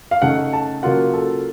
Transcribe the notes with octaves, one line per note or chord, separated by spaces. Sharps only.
F5
C#3 A3 D#4 F#5
A5
C#3 F#3 A#3 F4 F#5
A4